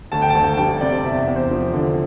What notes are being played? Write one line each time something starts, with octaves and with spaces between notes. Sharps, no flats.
D2 A5
G5
A5
D2
A5
G3 G5
C3 D5
E2 E5
E5
E2
C5
F3
D3